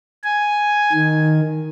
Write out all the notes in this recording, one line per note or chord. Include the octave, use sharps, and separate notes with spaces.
G#5
D#3